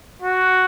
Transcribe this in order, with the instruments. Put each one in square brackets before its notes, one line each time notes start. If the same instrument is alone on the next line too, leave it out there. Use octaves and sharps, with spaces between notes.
[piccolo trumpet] F#4